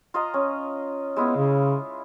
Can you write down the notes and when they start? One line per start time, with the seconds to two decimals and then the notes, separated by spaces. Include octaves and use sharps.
0.14 F4 D#5 A#5
0.34 C#4
1.16 G#3 B3 E4 F4
1.36 C#3